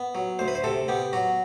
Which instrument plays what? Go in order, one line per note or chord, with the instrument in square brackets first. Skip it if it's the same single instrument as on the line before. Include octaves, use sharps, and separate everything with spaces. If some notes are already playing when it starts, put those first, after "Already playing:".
Already playing: [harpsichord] B3
F#3
D2 C5
B4
C5
C3 A4
B3 G4
F#3 F#4